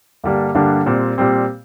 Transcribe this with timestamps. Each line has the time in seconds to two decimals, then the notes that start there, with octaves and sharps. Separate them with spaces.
0.24 G2 D3 G3 A#3 D4
0.55 G2 D3 G3 A#3 D4
0.86 A#2 G3 C4
1.18 A#2 G3 C4